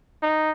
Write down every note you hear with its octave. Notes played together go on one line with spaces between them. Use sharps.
D#4